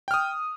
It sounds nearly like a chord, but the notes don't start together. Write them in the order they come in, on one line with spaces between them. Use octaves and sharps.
G5 F6 D#6